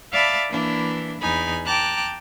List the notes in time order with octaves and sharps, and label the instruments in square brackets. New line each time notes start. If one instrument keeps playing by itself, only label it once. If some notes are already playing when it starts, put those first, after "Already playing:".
[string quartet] D5 E5 F5 A5 B5
E3 A#3 D4 E4
E2 D#4 G#5 B5
G5 A5 A#5 D6 F#6